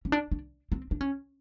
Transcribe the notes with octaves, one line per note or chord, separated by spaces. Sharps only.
C#4
D4
D4
C4
D4
C#4